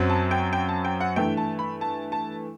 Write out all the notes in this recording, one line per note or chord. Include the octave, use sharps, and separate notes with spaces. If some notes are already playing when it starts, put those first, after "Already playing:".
Already playing: F#2 F#3 C4
A5
G5
G5
A5
G5
F#5
G2 E3 A3 G5
A5
B5
A5
A5